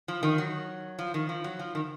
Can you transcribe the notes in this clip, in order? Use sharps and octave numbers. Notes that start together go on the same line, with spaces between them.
F3
D#3
F#3
F3
D#3
F3
F#3
F3
D#3